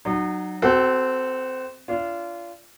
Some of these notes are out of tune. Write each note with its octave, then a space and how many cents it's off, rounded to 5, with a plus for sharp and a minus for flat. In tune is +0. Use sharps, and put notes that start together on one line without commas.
F#3 +10 D#4 -35
C4 -15 F#4 +25 A4 -10
D4 -35 F4 -25